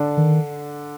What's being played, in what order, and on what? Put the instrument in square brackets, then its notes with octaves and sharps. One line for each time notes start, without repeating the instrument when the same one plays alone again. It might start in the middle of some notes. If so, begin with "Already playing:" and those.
Already playing: [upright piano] D3 D4
[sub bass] D#3